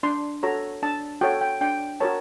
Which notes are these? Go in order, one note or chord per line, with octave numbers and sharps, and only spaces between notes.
D4 C6
F#4 A4 C#5 A#5
D4 A5
F#4 A4 C#5 G5
G5
D4 G5
F#4 A#4 C#5 A5